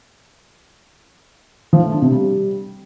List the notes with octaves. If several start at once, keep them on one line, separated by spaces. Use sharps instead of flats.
F3
A3
D4
C3
G3